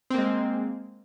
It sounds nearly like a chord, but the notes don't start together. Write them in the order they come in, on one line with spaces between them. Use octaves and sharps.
C4 A#3 G#3